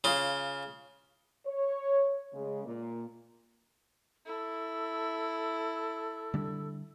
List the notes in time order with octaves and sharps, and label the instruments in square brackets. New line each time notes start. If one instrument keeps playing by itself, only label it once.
[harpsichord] C#3 F4
[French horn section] C#5
C#3 G#3
A#2 A#3
[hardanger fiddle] E4 [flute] A4
[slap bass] D3 G3 D4